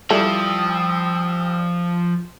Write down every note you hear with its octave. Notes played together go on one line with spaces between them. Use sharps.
E3 F3 G3 A4 G5 D#6 E6